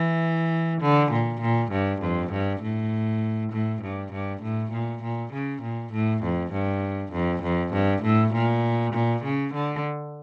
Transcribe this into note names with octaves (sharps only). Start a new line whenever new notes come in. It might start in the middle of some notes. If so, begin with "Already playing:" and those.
Already playing: E3
D3
A#2
A#2
G2
F2
G2
A2
A2
G2
G2
A2
A#2
A#2
C#3
A#2
A2
F2
G2
F2
F2
G2
A2
A#2
A#2
C#3
D3